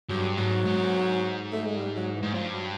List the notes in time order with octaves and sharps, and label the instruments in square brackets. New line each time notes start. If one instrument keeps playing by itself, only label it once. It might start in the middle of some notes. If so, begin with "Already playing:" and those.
[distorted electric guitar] G2 [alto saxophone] F#3
[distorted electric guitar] G#2 [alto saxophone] F#3
[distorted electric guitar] G#2
[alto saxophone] A3
G#3
G3
F#3
E3
[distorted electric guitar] G#2
[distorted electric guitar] G2 [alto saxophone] F3
[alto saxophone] F#3